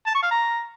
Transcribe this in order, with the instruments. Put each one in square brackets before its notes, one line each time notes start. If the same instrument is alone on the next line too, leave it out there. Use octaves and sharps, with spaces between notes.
[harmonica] A5
C#6
F5
A#5